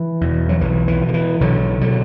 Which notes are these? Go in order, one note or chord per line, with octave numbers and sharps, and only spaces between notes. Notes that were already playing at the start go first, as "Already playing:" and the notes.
Already playing: E3
E2 B2
F#3
B1 E3
E3
B2
D3
E3
B1 D3 F#3
B2 D3 F#3